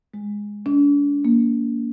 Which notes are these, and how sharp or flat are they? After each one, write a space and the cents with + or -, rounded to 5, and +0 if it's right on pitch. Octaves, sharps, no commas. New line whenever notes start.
G#3 -10
D4 -40
A#3 +5